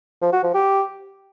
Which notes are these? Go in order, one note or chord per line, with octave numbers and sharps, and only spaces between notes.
F3
F#4
F3
G4